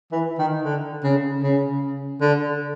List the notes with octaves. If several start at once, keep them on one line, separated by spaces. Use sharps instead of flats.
E3
D#3
D3
C#3
C#3
D3